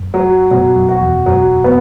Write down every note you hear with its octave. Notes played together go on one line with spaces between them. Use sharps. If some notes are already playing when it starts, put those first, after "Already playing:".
Already playing: F#2
F#3
B2 F#3
F#2
F#4
E2
F#2 F#3
B3